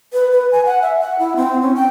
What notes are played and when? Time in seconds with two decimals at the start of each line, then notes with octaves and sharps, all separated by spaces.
0.13 B4
0.31 B4
0.52 G#5
0.65 F#5
0.82 E5
1.00 F#5
1.19 E4
1.36 C4
1.62 C#4
1.75 G5